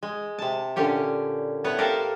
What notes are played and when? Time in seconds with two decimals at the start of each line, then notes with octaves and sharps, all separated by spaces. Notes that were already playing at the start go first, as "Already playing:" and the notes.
0.03 G#3
0.39 C3 A5
0.76 A#2 D3 C#4 G4 C#5
1.64 A2 B3 B4 C#5 F#5
1.78 G4 A4 A#4 C5 F5 A5